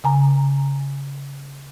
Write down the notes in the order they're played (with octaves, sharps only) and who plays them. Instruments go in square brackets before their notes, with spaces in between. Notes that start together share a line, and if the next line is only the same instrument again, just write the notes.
[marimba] C#3 G#5 A#5